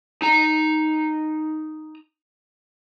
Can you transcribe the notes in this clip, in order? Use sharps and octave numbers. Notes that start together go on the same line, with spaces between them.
D#4 A#5